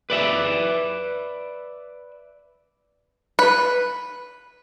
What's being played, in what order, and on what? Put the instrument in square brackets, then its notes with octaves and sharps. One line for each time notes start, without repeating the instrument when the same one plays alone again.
[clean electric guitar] B4 D5 E5
[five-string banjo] B4